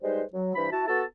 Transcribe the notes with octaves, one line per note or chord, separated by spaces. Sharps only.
G3 G#3 D#4 B4 C5
F#3
G2 E3 C5 B5
E4 F#4 A5
B3 F#4 A4 A5